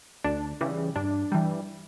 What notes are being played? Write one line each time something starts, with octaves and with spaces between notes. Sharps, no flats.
D2 D4
C#3 E3 G3
G2 D4
E3 G3